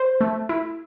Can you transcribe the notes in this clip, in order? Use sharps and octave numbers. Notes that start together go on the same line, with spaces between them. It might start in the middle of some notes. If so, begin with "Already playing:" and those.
Already playing: C5
A3
E4